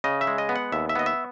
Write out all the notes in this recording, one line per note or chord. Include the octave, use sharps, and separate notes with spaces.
C#3 D#5
E5
G#3
D#5
B3
F#5
D#2 E5
E5
B3 D#5
E5